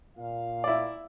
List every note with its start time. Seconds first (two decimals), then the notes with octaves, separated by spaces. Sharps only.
0.18 A#2 F5
0.64 E4 D5